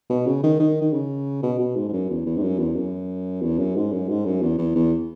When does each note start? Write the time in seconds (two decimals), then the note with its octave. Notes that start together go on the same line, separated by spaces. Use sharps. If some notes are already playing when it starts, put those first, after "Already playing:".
0.10 B2
0.26 C#3
0.43 D#3
0.59 D#3
0.81 D#3
0.93 C#3
1.42 B2
1.59 B2
1.76 G#2
1.88 G#2
1.93 F#2
2.10 E2
2.26 E2
2.37 G#2
2.43 F#2
2.59 E2
2.76 F#2
3.42 E2
3.58 F#2
3.76 G#2
3.92 F#2
4.09 G#2
4.26 F#2
4.42 E2
4.58 E2
4.75 E2